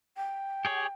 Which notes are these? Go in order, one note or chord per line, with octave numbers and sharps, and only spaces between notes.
G5
G4 G#4 C#5